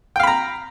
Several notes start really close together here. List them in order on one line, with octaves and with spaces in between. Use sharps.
G5 F5 B5 A#5